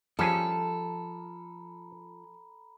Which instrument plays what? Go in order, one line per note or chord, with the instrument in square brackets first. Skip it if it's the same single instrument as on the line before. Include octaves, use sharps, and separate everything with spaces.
[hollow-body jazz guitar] F3 [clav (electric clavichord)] G3 C#4 G#4 [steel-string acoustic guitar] A4 [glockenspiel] A#5 B5